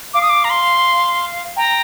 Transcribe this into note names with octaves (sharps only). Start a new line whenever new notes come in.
F5 D6
D#6
D6
A#5
C6
G5 A#5